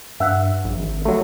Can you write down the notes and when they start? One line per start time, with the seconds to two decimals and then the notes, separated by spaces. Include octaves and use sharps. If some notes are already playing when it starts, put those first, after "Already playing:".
0.20 G2 E5 F#5
0.64 A#1
0.79 G#1
1.05 F#3 A3